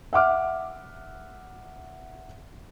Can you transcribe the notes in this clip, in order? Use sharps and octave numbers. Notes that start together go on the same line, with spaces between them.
E5 F#5 D6 F6